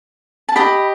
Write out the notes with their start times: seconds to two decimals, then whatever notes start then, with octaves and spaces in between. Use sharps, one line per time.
0.49 A5
0.55 G4 D#5 B5